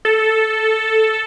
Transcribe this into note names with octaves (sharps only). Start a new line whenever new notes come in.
A4